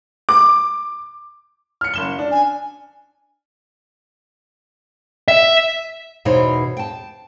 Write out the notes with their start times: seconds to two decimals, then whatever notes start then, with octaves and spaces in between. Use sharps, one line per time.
0.29 D6
1.81 F6 C#7
1.94 F#1 E7 G7
2.19 D4
2.31 G#5
5.28 E5
6.25 E2 B2 E3 D#4 C5 C#5
6.77 G5 A5